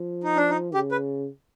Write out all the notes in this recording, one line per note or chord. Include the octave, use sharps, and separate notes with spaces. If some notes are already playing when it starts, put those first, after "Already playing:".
Already playing: F3
D#4
D4
D#4
C#3 G4
B4